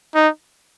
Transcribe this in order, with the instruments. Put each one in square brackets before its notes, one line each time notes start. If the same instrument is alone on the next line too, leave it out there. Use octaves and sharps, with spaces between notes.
[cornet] D#4